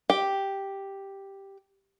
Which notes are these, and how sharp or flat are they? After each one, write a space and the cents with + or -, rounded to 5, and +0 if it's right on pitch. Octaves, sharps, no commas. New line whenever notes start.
G4 +0 G5 +0